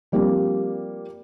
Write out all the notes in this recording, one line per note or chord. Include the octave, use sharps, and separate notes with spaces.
F3 G3 A#3 C4 D4